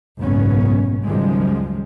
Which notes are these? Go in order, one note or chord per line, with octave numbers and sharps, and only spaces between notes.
F#1 B1 G#2 B2 B3 C#4
C#2 F#2 D#3 F3 G3 G#3